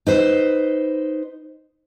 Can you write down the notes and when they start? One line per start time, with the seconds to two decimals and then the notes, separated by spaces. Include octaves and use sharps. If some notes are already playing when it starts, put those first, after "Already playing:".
0.07 D#4 B4 C5